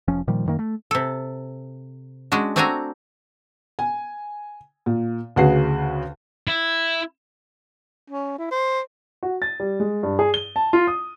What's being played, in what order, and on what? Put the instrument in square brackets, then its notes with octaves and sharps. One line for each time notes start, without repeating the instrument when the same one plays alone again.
[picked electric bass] F1 F3 C#4
A#2 D#3 F3 G3
F#2 D#3 A#3
A3
[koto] C3 A4
G#3 C#4 D4 F#4
A3 C4 D4 F#4 G#5 A#5
[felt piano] G#5
A#2
D2 C#3 F#4 G#4 B4 C7
[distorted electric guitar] E4
[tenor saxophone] C#4
E4
C5
[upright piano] F#4
A6
G3
G#3
G2
G#4
G7
A5
F4
D#6